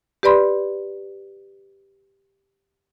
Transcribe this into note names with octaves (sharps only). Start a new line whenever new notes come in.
G4 B4 D5 B5 C6